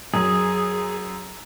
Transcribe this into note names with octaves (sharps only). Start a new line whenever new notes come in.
F#2 G#4